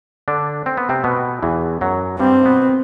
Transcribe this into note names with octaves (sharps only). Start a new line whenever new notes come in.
D3 D4
C4
B3
C3 C4
B2 B3
E2 E3
F#2 F#3
G2 G3 C4
B2 B3